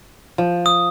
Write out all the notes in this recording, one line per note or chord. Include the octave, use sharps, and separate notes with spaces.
F3
D#6